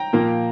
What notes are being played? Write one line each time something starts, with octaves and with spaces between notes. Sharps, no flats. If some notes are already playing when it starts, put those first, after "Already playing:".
Already playing: G5 A#5
A#2 F3 A#3